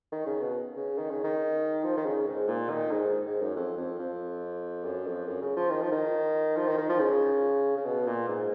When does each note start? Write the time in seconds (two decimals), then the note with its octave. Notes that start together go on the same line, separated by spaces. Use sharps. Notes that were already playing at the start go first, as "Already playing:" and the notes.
0.12 D#3
0.26 C#3
0.40 B2
0.76 C#3
0.98 D#3
1.10 C#3
1.24 D#3
1.84 F3
1.97 D#3
2.05 C#3
2.27 G#2
2.48 A#2
2.69 D#3
2.91 G#2
3.26 G#2
3.41 F#2
3.55 F2
3.77 F2
3.99 F2
4.85 F#2
5.06 F2
5.27 F#2
5.42 C#3
5.56 F3
5.70 D#3
5.81 F3
5.92 D#3
6.56 F3
6.67 D#3
6.78 D#3
6.89 F3
6.99 C#3
7.77 C#3
7.85 B2
8.07 A#2
8.28 G#2